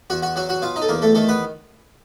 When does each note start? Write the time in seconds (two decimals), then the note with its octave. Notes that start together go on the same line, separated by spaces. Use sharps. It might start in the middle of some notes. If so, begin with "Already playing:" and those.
0.10 E2 F#4 F#5
0.23 F#4 F#5
0.36 F#3 F#4 F#5
0.49 F#4 F#5
0.62 B2 F4 F5
0.76 D#4 D#5
0.82 A4
0.88 E2 A#3 A#4
1.02 A3 A4
1.15 D#3 A3 A4
1.29 B3 B4